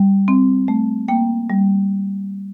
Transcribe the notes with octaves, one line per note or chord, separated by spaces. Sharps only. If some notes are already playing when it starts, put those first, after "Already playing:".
Already playing: G3
C4
A3
A#3 G5
G3